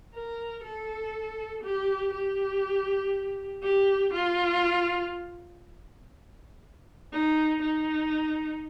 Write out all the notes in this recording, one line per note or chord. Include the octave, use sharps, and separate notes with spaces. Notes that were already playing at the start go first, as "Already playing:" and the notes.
A#4
A4
G4
G4
G4
F4
D#4
D#4